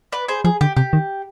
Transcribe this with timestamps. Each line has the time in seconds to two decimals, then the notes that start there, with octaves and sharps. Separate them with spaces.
0.12 B4 D5
0.28 G#4 C5
0.44 F3 G#4
0.61 D3 G4
0.76 C3 G4
0.93 D#3